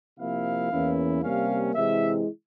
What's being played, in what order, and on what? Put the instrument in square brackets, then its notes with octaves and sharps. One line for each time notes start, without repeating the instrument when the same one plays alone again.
[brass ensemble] C3 F3 A#3 E4 F5
E2 E3 A#3 C#4 E4
C3 G3 A#3 C#4 F5
C3 E3 G#3 E4 E5